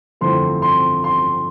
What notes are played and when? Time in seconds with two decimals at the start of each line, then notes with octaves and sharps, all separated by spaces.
0.21 G1 F2 E3 A3 C4 C6
0.62 C6
1.04 C6